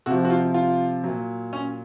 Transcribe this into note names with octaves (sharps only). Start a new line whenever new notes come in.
C3 F3 F#4
F#4
F4
F4
A#2 F#3
C#4